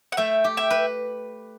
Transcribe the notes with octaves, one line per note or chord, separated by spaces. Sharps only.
F#5
A3 E5 G5
G4
E5 G5
B4